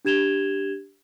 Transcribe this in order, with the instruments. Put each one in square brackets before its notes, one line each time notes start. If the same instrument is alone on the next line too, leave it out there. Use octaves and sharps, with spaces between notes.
[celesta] D4 G4 G#6 E7 F7 G7